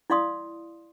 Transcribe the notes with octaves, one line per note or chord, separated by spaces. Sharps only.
E4 D5 F5 C6 D#6